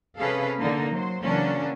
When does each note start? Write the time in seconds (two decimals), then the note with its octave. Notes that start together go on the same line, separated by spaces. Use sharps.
0.19 C3 C#4 G#4 A4 B4 F5
0.58 D3 A#3 D#4
0.92 F#3 C5
1.23 C#3 E3 F#3 A#3 C#4 D4